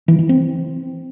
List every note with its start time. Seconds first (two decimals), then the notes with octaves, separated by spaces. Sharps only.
0.08 E3
0.19 E3
0.29 C4